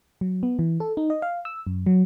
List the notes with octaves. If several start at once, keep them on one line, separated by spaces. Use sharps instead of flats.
F#3
B3
E3
A4
D#4
D#5
F5
E6
F#2
F#3